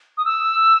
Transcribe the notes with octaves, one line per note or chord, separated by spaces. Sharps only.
D#6
E6